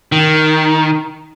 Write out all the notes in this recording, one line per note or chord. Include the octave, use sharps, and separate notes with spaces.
D#3